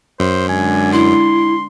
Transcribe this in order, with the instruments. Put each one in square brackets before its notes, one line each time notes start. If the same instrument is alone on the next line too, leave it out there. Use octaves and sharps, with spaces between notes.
[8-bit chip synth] F#2 [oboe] C5
[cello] D3 G#3 [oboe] G#5
[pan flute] E4 [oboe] C6